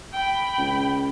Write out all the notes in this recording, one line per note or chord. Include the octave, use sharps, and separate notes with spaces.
G5 B5
C#2